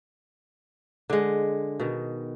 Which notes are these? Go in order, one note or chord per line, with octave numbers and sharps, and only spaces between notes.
D3 G#3
B2 D#3